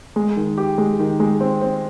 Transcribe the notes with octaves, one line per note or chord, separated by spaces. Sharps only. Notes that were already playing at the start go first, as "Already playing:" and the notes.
G#3
D#3
G4
G#3
D#3
G#3
C4
C4